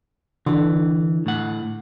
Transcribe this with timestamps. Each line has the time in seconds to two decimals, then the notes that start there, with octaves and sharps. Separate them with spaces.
0.47 D3 E3
1.26 A2 F#5